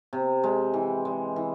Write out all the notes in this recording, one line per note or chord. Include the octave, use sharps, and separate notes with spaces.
C3
G#3
E3
G#3
E3